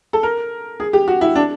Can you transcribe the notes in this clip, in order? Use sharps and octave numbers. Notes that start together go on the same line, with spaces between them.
A4
A#4
G#4
G4
F#4
E4
D4